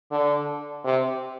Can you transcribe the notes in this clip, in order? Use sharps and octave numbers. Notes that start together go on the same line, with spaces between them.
D3
C3